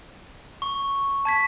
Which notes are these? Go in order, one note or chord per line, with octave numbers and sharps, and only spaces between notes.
C#6
A5 G#6 B6